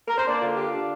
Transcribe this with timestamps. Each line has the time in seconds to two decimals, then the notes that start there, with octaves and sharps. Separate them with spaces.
0.08 A#4
0.18 C5
0.27 A#3 D4 D5
0.42 D3 F4
0.57 F4 G4
0.73 D4